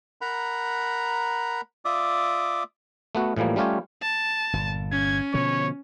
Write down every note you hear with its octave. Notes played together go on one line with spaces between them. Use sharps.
A#4 F#5 A#5 B5
F4 D5 E5 D6 D#6
A3 B3 F#4
A2 E3 F3 G3 A#3
G3 A3 C#4 F4 G4 C#5
A5
G1 A#2
C#4 G#6
B2 D3 F3 C#5